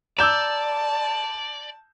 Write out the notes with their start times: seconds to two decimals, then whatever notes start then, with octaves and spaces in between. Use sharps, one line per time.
0.19 D5 A5 A#5 D6 E6 G6 E7